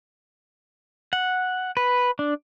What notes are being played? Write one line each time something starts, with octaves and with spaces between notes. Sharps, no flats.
F#5
B4
D4